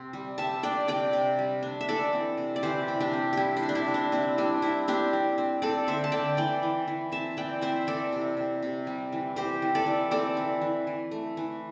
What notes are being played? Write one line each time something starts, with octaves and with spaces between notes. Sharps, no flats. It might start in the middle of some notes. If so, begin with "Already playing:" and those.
Already playing: C3 C4
G3
G3 E5 A5
D4 D5 G5
C3 D5 G5
C3
G3
D4
E5
E3 A4 D5
C4
C3
D5
E3 G4 C5
C3
D4 G4
C4
G3 E4 G4
D4
C3
D4
E4
C3
D4
C4 E4
G3 D4
C4 E4
C4 D4 G4
C4
C4
C4 A4 D5
D3 C5 E5
A5
D3 D5 G5
E3 D5 G5
E3
E3
C4 E5 A5
E3 D5 G5
C4 C5 E5
E3 A4 D5
C3
C3
C3
G3
E3
C4 G4 C5
E3
A4 D5
E3
C4 A4 D5
E3
E3
E3
A3
E3